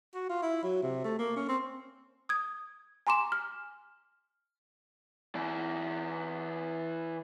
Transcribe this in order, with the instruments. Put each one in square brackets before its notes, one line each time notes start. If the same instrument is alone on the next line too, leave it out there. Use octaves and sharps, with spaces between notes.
[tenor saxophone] F#4
F4
E4
F#3
C3
A3
A#3
C#4
C4
[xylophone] D#6 G#6
G#5 A#5 C6 D6 E7
F6
[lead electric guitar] E3 D5